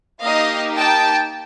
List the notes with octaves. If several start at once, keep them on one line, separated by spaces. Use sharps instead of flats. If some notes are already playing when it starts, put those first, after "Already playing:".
A#3 D#4 G4 D#5 F5
G5 A5